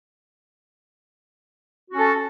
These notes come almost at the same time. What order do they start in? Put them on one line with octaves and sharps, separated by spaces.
F#4 C#4 A4